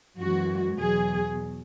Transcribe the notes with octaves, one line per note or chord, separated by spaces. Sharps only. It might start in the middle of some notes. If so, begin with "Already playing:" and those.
F#2 E3 G#3 F#4
E2 B2 F#3 G#4